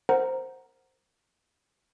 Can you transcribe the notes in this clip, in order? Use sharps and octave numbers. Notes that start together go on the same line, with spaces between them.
A#4 C5 F#5 A#5